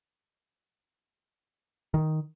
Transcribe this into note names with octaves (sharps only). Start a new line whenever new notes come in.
D#3